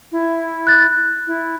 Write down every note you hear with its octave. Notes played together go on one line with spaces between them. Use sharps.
E4
F#6 A6
E4